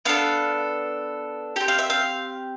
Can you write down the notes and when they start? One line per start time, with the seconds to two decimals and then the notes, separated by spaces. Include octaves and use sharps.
0.05 B3 D4 A4 F5
1.56 C4 G4 G5
1.68 F5
1.79 E5
1.90 F5